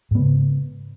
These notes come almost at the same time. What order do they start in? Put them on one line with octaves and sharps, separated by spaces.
G#2 B3 C#3